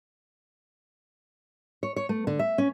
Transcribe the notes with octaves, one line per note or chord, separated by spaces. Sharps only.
C#5
C#5
A3
D3
E5
C#4